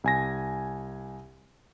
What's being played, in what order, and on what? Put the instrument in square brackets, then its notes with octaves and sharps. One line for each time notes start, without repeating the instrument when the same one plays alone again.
[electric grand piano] C2 G#5 A#6